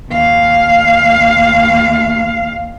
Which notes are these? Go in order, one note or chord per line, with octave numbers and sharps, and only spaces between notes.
D#2 F5